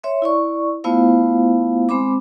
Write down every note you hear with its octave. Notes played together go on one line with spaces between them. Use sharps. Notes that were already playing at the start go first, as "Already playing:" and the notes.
C#5 E5 C6
E4 D5 C#6
A3 B3 E4 F4 C5 F5
G#3 C4 C5 B5 D6